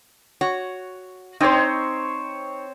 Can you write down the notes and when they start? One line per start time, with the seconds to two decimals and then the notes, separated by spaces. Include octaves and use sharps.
0.41 F#4 C#5 F#5
1.40 C4 D#4 C5 C#5